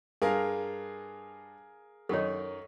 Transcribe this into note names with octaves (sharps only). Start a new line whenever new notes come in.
G2 G#4 A#4 F5
F#2 D#3 D#4 A4 C#5